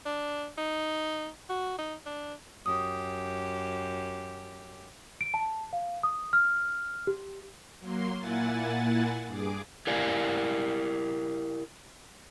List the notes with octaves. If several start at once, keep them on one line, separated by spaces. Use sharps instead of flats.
D4
D#4
F#4
D#4
D4
F#2 G4 D#6
D7
A5
F5
D#6
F6
G4
F#3 A#3 C6
A#2 A#3 E4 F#5 G#5 A6
G2 G#4 D6
E4 G4 A#4 D5 F5 G#5